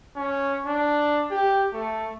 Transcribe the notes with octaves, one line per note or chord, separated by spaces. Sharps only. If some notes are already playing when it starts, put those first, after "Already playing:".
C#4
D4
G4
A3